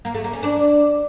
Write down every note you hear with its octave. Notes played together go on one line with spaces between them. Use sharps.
A#3
A3
A#3
C#4
D4